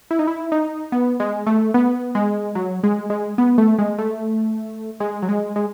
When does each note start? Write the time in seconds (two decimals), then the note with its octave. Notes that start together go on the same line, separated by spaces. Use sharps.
0.11 E4
0.19 D#4
0.27 E4
0.52 D#4
0.92 B3
1.20 G#3
1.47 A3
1.74 B3
2.15 G#3
2.55 F#3
2.83 G#3
3.10 G#3
3.38 B3
3.58 A3
3.79 G#3
3.98 A3
5.00 G#3
5.22 F#3
5.29 G#3
5.56 G#3